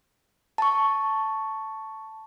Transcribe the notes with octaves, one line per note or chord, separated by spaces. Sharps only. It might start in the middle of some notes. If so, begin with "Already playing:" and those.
A5 C#6